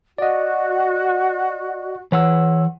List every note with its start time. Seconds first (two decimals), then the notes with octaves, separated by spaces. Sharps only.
0.18 F#4 D5 D#5
2.12 E3 C#5 F#5 E6